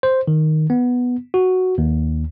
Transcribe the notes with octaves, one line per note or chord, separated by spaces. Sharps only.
C5
D#3
B3
F#4
D#2